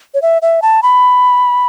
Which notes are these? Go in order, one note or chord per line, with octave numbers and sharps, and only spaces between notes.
C#5
E5
E5
A5
B5